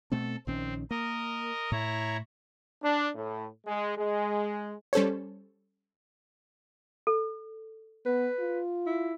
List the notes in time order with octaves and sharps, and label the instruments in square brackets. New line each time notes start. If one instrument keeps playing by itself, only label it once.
[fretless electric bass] B2 A3 C4 [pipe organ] A4
[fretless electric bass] A#1 D#3 C#4 [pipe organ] C4
[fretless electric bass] A#3 [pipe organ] A#4 D#5
[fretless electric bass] A2 [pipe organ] E4 C#5 A#5
[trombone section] D4
A2
G#3
G#3
[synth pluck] G3 C#4 A4 C5 C#5
[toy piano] A4
[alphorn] B3 [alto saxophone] B4
[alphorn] F4
[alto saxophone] E4